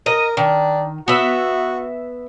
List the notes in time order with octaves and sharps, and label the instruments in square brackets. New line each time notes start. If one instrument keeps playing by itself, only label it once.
[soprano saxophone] A#4 [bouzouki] D#5
[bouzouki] D#3 [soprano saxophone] D4
[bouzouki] B3 E5 [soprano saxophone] F#4